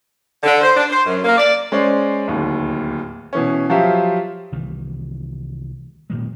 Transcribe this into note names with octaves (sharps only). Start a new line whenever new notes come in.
D3
C5
D4
C5
F#2
A#3
D5
G#3 C#4 C5 D5
D1 D#2
B2 E3 C#4
F3 F#3 F4 G4 E5
C2 D#3 E3
F#1 A#2 D#3 G#3